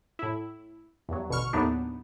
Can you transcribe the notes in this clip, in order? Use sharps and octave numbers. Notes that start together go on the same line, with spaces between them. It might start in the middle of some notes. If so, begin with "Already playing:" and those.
A2 E4
E2 G2 F#3
A1 B2 D3 C#6 F6
D#2 A2 F#3 B3 D4 D#4